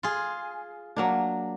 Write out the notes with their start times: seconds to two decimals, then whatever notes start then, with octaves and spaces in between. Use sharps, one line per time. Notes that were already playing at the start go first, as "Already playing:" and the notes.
0.03 F4 G#4
0.96 F#3 A#3 D4